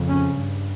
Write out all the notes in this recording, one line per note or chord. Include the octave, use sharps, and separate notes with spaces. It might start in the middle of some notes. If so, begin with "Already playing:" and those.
Already playing: F2 C#3
C#4
G2